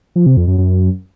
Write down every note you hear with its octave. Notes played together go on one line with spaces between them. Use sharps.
F3
C3
F2
F#2
F#2